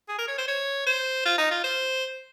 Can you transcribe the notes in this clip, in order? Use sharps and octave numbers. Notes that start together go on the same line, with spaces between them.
G#4
A#4
C#5
C5
C#5
C5
F4
D#4
F4
C5